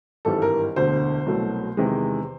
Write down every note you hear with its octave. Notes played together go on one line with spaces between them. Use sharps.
G#1 G2 E3 G3 A4
A#4
E1 D2 D3 C5
C2 B2 F#3 A3
E2 C3 D#3 G#3